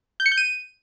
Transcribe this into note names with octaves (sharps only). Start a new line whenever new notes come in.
G6
C#7
G6
D#7